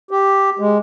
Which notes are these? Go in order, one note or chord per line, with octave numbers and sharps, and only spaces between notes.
G4
G#3